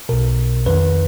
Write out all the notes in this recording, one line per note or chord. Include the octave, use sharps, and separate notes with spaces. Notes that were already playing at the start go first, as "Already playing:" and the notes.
B1 B2 A#4
F2 D#3 B4